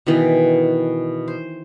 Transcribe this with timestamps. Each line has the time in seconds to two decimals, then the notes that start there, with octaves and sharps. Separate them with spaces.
0.07 B2 D#3 E3
1.28 C5